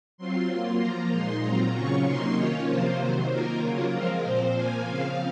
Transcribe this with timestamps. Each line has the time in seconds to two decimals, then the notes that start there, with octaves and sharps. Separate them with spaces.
0.17 F#3 C4 F4 C6
0.48 F#3 A#3 F4 C6
0.80 F3 A#3 F4 A#5
1.11 A#2 G#3 D#4 C6
1.43 A#2 F#3 C4 F4 A#5
1.74 C#3 F#3 C#4 F4 C#6
2.05 C3 F#3 A#3 D#4 C6
2.36 D#3 A#3 C#4 F4 C#5
2.67 C3 F3 A#3 F4 C5
2.99 C3 D#3 F#3
3.30 D#3 A#3 F4 A#4
3.62 C#3 F#3 A#3 F4 A#4
3.93 F3 G#3 C4 F4 A#4
4.24 A#2 F3 C4 C5
4.56 F3 A#3 F4 G#5
4.86 C#3 F3 C4 F5